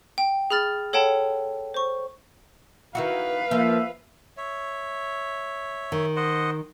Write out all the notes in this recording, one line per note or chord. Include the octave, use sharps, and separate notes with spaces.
G5
G#4 B5 F6 A6
A4 C#5 F#5 G5 A5 B5
C5 C#6
D#3 E4 F#4 B4 F5
F3 A#3 E5
C#5 E5
D#3
C5 D#5 F#5